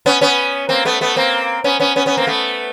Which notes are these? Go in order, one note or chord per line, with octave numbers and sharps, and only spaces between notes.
B3 C#4
B3 C#4
A#3 C4
A3 B3
A3 B3
A#3 C4
B3 C#4
B3 C#4
B3 C#4
B3 C#4
A#3 C4
A3 B3